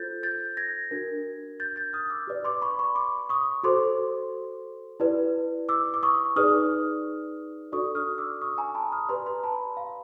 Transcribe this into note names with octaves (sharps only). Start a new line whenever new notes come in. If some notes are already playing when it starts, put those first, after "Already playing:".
Already playing: F4 A4 C5 G6 A6
G6 A6
G#6 A#6
D4 F#4 A#4
G6 A6
G6 A6
D#6 F6
D6 E6
G4 B4 D5
C6 D6
B5 C#6
B5 C#6
C6 D6
C#6 D#6
F#4 A4 C5 C6 D6
E4 G4 B4 D5
D6 E6
D6
C#6 D#6
D#4 G#4 B4 D5 D#6 F6
D4 F#4 A4 D5 C#6 D#6
D#6 F6
D6 E6
C#6 D#6
G#5 A#5
A5 B5
D#6 F6
G4 B4 D5 A#5 C6
A#5 C6
A5 B5
F5